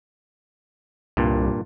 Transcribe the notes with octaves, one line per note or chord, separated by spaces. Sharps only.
C2 G2 A#2